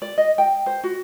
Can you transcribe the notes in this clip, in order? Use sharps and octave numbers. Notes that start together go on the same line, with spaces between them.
D5
D#5
G5
C5
F#4